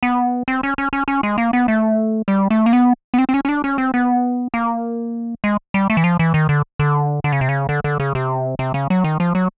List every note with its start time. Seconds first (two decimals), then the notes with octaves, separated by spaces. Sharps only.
0.03 B3
0.48 C4
0.63 C#4
0.78 C#4
0.93 C#4
1.08 C#4
1.23 G#3
1.38 A#3
1.53 B3
1.68 A3
2.28 G3
2.50 A3
2.66 A#3
2.73 B3
3.14 B3
3.18 C4
3.29 C4
3.34 C#4
3.45 C#4
3.49 D4
3.64 C#4
3.78 C4
3.94 B3
4.54 A#3
5.44 G#3
5.74 G3
5.90 A3
5.97 E3
6.04 F3
6.19 E3
6.34 D#3
6.49 D3
6.79 D3
7.24 D3
7.32 C#3
7.41 C3
7.49 C#3
7.69 D3
7.84 D3
8.00 C#3
8.15 C3
8.59 C3
8.74 C#3
8.90 F#3
9.04 D#3
9.20 F3
9.35 F#3